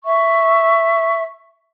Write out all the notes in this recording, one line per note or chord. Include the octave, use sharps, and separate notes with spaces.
E5 C#6